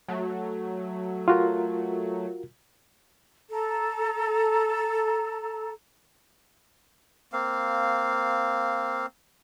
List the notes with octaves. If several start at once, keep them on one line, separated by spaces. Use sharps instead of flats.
F#3 A3
F4 F#4 A#4
A4 A#5
A#3 C4 F5